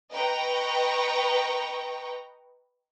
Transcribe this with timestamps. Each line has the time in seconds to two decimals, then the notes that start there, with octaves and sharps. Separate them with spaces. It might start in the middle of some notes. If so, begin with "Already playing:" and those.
0.12 B4 D#5 G5 A#5 C#6